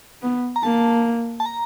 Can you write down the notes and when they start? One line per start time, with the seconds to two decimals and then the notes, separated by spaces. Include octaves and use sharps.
0.22 B3
0.56 A#5
0.63 A#3 A5
1.40 A5
1.46 A#5